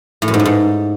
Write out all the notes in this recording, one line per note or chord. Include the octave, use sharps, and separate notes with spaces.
A2
F#2
G#2
A2
G#2